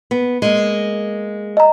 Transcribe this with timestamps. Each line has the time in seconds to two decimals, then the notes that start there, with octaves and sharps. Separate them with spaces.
0.11 B3
0.42 G#3 A#3
1.57 D#5 A#5